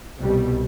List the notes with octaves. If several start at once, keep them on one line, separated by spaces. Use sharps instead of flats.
C2 B2 G3